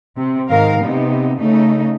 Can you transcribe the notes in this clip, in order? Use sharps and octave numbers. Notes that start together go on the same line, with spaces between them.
C3
G#2 D#3 A#4 F5
C3 B3 D#4
C#3 A3 D#4